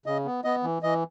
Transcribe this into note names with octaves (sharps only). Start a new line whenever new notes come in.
C#3 D#5
B3
B3 D#5
E3
E3 D#5